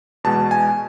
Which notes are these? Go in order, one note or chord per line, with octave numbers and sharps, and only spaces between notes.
E2 B2 G#3 A5
G#5